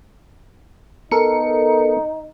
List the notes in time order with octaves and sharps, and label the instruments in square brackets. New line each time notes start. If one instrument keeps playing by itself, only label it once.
[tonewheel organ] B3 [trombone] D#4 [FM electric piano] A4 A#4 C#7